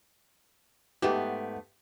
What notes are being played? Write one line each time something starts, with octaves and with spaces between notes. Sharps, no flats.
G#2 A3 B3 G4